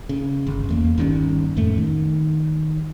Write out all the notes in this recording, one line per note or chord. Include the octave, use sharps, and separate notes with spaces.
C#3
G1
E2 A3 A#3
G1 D#3 G3 C#4
F2 A2 A3
D#3